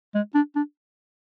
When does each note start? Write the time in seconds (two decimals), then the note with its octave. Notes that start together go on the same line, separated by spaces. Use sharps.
0.15 G#3
0.35 D4
0.56 D4